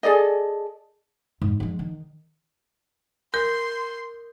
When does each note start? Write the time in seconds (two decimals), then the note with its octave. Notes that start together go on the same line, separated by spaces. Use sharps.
0.03 G#4 A4 D5 D#5
1.42 G#2
1.60 F3 G#3
1.79 D#3
3.34 A#4 C6 G6